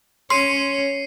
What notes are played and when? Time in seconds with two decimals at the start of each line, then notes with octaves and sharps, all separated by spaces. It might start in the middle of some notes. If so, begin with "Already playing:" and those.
0.30 C#4 C#5 C6 C7 C#7 D#7